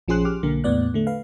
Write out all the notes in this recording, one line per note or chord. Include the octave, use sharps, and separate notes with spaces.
A#1 F3 C#4 G#4 C6 F#6
G4 D6 F6
B1 D3 A#3
E2 A2 B3 D5 F#6
D3 A3
B4 F5